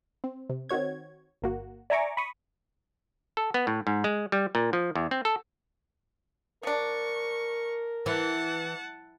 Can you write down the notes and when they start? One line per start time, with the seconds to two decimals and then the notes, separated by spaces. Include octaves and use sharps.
0.24 C4
0.50 C3
0.69 D#3 C4 F#4 C#5 G#6
1.42 G1 A#3 F#4
1.90 D5 E5 G#5 A#5 C#6 D6
2.17 B5 C#6 D#6
3.37 A4
3.54 B3
3.67 A2
3.87 G#2
4.04 G#3
4.32 G3
4.55 A#2
4.73 F3
4.95 E2
5.11 C4
5.25 A4
6.63 F3 D4 A#4 C#6
8.06 E3 F#5 A5